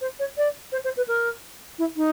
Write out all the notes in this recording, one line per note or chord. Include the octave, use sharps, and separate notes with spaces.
C5
C#5
D5
C5
C5
B4
A#4
E4
D#4